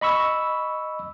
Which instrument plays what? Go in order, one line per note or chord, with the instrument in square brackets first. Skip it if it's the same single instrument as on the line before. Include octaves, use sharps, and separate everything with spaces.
[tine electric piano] D#5 B5 C#6 E6